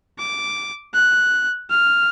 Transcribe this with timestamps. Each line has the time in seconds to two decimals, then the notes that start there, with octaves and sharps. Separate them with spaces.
0.19 D6
0.94 F#6
1.70 F6